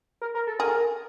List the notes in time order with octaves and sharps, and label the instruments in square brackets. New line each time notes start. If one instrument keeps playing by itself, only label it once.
[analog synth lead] A#4
A#4
A4
[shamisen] G#4 [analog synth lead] A#4